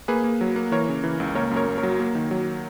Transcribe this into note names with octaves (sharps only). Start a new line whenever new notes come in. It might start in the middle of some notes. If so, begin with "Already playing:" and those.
A#3 G#4 B4
A#3
F#3
A#3
E3 A#4 C#5
C#3
E3
C#2
A#3 A#4 C#5
F#2
A#4 C#5
A#3
A#4 C#5
F#3
A#3
D#3
F#3